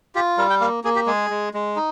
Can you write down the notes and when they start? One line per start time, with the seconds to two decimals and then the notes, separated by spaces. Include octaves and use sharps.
0.15 F4 G4
0.38 G3 A#4
0.50 G5
0.60 A#3 F5
0.84 A#3 G#4
0.95 G4
1.06 G#3 G#4
1.30 G#3
1.54 G#3
1.76 D#4